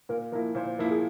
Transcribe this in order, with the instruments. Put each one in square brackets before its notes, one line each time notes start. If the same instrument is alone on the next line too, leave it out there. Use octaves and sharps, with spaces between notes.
[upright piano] A#2 [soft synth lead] A#4
[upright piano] F3 A#3 E4 [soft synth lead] A#4
[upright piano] A#2 [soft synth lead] C5
[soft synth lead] C5
[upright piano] F3 A#3 E4 [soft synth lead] A#4
[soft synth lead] G#4